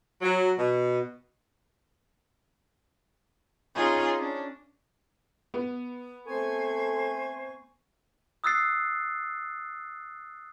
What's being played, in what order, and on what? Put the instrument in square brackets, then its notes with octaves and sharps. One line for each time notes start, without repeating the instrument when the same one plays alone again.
[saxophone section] F#3
B2
[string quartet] C#4 D#4 F4 G#4
C#4 D4
[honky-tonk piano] B3
[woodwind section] A3 C4 G#5 [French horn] A4 [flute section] C5 C6 C#6
[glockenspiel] D#6 E6 F#6 A6 C7